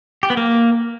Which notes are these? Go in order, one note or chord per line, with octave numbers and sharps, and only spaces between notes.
G4
B3
A#3